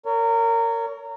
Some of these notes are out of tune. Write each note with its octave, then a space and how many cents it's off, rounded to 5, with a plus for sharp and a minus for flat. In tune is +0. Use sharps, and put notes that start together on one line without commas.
A#4 -20 C#5 +25